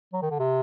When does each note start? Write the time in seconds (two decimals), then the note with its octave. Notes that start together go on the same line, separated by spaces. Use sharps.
0.13 F#3
0.22 D#3
0.31 D3
0.40 C3